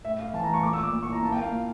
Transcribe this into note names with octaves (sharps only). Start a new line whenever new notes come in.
A2 E5
A3 F5
E3 A5
A#5
A3 C#6
A#2 D6
E6
A#2 D6
A#2
C#6
E4 A#5
A#3 A5
G5
A#3 F5
A#2